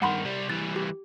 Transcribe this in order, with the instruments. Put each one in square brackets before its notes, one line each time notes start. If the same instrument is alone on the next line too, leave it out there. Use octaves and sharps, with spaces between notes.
[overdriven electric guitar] G2 D#3 [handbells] F#5 B5 C6
[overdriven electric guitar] C3 G3
[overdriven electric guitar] E3 G3 [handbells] A6
[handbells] G4